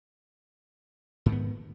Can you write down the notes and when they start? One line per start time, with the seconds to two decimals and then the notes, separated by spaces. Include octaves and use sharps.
1.26 G#2
1.29 D#3
1.32 B3